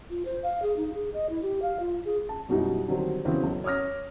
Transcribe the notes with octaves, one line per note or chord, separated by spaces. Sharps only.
F4
C5
F5
G#4
D#4
G#4
D#5
E4
G4
F5
F4
G#4
A5
F#2 B2 G3 D#4 E4
D3 D#3 F#3 G3 C4
C#3 E3 F#3 B3 C4
B1
C#5 D6 D#6 F6 A#6